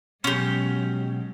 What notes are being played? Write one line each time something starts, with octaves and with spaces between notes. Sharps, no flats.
B2 F#3 G#3 C#4 G4